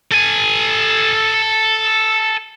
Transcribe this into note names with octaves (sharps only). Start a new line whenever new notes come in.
A4 G#5